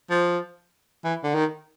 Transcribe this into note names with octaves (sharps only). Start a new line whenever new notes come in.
F3
E3
D3
D#3